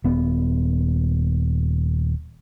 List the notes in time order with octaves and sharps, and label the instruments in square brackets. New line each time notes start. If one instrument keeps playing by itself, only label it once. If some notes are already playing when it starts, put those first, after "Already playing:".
[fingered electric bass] D#1 B3